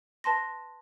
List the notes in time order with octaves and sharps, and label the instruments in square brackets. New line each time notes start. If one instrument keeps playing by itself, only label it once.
[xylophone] B4 A5 C6 A#6